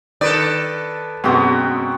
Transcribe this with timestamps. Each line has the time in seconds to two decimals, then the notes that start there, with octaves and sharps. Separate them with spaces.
0.21 D#3 A4 B4 D5
1.24 F#2 B2 G#3 C4 F#4 D#6